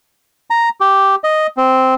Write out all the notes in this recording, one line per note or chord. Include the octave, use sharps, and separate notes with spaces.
A#5
G4
D#5
C4